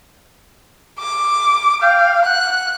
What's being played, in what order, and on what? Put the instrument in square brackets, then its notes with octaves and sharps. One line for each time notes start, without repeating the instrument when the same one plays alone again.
[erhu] D6
[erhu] F5 [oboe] G5
[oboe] F#5 [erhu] F#6